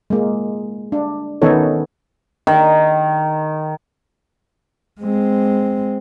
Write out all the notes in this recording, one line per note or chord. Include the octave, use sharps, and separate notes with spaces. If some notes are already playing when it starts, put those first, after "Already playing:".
G#3 A#3
D4
D#3 B3 C#4 D#4 A4 C#5
D#3
G#3 C4